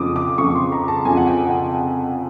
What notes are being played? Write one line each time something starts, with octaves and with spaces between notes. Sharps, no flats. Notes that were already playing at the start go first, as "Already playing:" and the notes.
Already playing: F2 C#3 F3 D6 D#6
D6
F2 C#3 F3 C#6
C6
A#5
A5
F2 C#3 F3 G#5
F#5
G5
F#5